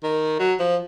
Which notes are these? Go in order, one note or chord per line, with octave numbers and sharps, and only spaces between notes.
D#3
F#3
F3